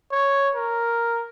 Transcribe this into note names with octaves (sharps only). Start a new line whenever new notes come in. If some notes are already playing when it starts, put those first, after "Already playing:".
C#5
A#4